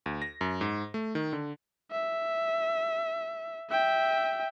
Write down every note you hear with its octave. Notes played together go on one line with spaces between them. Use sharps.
D2
A#6
F#2
G#2
A3
D#3
D3
E5
E5 G5